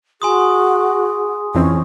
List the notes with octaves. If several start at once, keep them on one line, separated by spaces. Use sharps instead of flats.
F#4 G#4 G#5 C6 D#6
F2 E3 C4 C#4